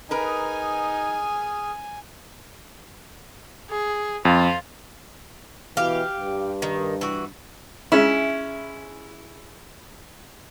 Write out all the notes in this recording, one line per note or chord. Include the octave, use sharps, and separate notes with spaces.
D#4 G#4 A#4 B4 G#5 D#6 F6
G#4
F2 F4
B2 E3 G4 F5
G2
D#3
E3 F#4
G#3 C#4 E4